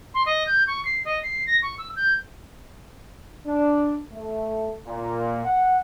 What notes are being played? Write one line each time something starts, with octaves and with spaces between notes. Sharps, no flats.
C6
D#5
G6
C#6
C7
D#5
C7
A#6
C#6
E6
G6
D4
A3
A#2
F#5